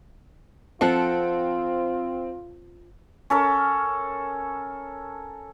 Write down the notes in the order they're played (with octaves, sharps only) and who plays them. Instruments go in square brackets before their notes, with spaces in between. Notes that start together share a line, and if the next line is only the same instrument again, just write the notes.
[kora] F3 A4 F#5 [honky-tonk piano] C4 [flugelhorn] F4
[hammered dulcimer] C#4 A4 A#4